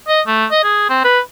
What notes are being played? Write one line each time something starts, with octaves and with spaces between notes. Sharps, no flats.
D#5
A3
D#5
G#4
C4
B4